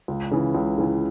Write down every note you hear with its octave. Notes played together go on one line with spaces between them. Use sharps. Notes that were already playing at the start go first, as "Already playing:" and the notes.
C#2
C#3 E3
C#2
C#3 E3